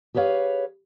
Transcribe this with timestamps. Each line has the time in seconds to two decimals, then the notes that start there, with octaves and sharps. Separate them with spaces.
0.14 G4 G#4 B4 C#5 F5